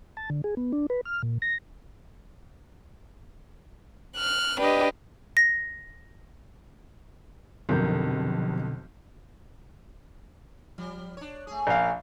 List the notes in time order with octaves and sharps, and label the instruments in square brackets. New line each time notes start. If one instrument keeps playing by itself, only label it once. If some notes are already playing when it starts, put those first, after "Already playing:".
[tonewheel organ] A5
D3
G#4
B3
D4
B4
F6
A#2
A#6
[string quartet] F6 F#6
D4 G4 B4 D#5
[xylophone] A#6
[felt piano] F1 A#4 G6 [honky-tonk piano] B1 F2 [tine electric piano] B2 D3
[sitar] F3 G3
D4 C#5
A3 G#4
[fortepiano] A#1 F5